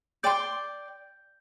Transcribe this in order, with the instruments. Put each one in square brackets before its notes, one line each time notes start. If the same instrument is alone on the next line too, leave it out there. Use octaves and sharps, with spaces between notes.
[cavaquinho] D5 G5 C6 [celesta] G6